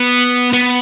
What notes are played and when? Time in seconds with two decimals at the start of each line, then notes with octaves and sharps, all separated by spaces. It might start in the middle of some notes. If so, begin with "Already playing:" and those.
Already playing: B3
0.53 B3